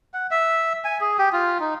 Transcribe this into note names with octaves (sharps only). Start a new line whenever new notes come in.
F#5
E5
G#5
G#4
G4
F4
D#4